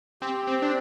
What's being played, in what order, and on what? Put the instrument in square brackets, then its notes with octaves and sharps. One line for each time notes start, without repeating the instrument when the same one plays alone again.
[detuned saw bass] C4 [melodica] G4
[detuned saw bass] C4
[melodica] C4 [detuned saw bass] D4